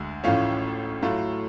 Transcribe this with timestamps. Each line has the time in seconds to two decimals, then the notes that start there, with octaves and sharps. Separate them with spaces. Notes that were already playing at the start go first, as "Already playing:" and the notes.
Already playing: D2 D3 G#3
0.24 A1 A2 F3 A3 C#4 F5
1.02 A2 F#3 A3 F4